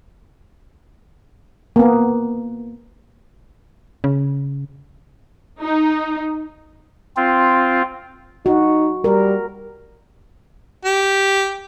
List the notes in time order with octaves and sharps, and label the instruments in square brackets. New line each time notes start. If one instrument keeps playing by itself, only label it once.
[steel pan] A#3 B3
[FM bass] C#3
[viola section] D#4
[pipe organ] C4 F4
[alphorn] D#4 [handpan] F#4
[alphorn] G3 [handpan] A#4
[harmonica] G4